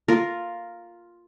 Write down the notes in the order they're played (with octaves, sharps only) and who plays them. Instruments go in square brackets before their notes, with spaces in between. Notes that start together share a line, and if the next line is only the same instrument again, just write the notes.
[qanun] F4 A#4